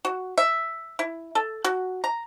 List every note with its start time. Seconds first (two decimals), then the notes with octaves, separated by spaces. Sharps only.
0.05 F#4
0.38 E5
0.99 E4
1.35 A4
1.64 F#4
2.04 A#5